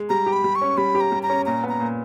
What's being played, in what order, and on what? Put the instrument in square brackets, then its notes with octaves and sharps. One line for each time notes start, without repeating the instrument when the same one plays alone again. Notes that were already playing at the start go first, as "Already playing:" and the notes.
Already playing: [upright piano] G#3
[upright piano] G3 [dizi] A#5
[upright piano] G4
[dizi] B5
[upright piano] G3
[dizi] C#6
[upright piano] C#4
[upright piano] G3 [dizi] B5
[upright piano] G4
[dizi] A#5
[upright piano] G3
[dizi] A#5
[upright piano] C#4
[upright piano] A#2 [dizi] A#5
[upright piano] B3
[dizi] A#5
[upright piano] A#2